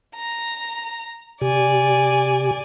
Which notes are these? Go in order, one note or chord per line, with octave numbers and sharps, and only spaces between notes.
A#5
C3 G4 D5 G#5